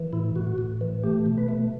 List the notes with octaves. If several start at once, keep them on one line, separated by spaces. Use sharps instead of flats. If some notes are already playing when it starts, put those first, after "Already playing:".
Already playing: E3
A2 E4
A2 F#4
A2
E3
A3 G4
B2
B4
A3